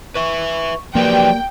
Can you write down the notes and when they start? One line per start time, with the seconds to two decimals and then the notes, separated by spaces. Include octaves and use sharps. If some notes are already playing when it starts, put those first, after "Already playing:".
0.15 B4 E5 C#6
0.95 F3 F#3 A#3 G4 B4 D5 G5